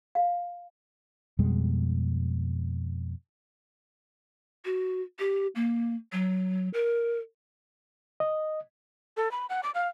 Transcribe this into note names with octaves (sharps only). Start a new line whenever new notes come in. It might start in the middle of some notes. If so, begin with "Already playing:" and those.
F5
F2 B2 G3 G#3
F#4
G4
A#3
F#3
A#4
D#5
A4
B5
F#5
D6
F5